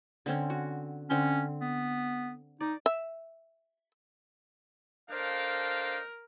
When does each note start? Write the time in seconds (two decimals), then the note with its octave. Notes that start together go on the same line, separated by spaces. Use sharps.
0.26 D3 C4 C#4
0.50 F#4
1.10 D3 C4 C#4 C6
1.61 B3
2.61 D#4 D5
2.86 E5
5.11 D4 A4 A#4 C5 D#5 F5 G5